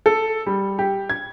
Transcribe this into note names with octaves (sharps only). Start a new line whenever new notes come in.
A4
G3
G4
G#6